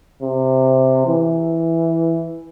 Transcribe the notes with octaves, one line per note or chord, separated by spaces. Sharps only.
C3
E3